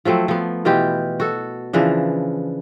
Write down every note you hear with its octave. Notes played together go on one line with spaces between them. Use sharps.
F3 F#3 A3 C4
F3 B3
B2 E3 F4 G4
F#4 A4
C#3 E3 F3 D4